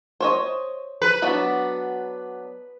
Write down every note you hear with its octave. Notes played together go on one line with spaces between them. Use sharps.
C5 C#5 D#5
B4
F#3 B3 D4